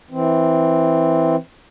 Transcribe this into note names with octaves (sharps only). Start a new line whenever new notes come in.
E3 C4